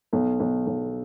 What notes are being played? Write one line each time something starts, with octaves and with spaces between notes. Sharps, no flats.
B1
B1
B1